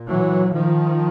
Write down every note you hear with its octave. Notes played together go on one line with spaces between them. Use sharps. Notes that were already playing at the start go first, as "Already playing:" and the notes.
Already playing: A#2
E3 F#3
D#3 F3